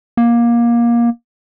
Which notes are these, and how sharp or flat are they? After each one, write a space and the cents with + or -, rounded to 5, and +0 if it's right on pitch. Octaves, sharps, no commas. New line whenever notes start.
A#3 +20